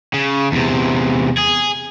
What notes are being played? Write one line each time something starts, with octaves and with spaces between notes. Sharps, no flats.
C#3
E2 C3
G#4